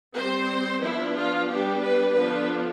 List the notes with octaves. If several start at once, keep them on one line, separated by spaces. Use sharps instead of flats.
G3 C4 C5
F3 B3 D4 E4
F4
G3 B3 D4 G4
B4
D3 F3 B3 D4 B4